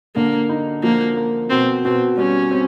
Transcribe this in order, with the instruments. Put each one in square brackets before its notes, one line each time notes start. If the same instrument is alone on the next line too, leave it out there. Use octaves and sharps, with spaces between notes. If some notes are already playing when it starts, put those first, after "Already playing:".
[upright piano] D3 [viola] A#3
[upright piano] D#4
[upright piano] F3 [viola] A#3
[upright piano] A#3
[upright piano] B2 [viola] C4
[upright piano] B2 [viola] C4
[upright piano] G3 [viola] C#4
[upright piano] C4